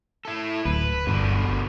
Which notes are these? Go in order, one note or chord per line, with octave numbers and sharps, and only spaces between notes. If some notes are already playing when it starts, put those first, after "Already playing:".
E4 A4
D1 B4
G1 B2 D3 D#3